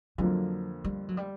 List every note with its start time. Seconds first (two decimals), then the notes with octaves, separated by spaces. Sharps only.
0.18 F2 D3 F3 F#3 A#3
0.84 G3
1.09 F#3
1.17 G3